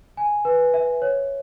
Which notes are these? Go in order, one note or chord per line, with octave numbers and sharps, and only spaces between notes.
G#5
B4
E5
C#5